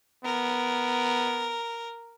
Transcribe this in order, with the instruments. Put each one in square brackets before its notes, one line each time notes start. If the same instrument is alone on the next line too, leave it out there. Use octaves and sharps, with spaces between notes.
[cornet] B3 [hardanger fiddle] A#4